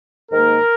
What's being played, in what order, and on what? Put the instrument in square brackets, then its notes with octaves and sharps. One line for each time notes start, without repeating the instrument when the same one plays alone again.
[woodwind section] G#2 D#3 A#3 A#4